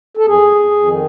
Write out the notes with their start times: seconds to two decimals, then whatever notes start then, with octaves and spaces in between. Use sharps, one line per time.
0.17 A4
0.26 F2 G#4
0.41 F2
0.55 F2
0.71 F2
0.85 D#3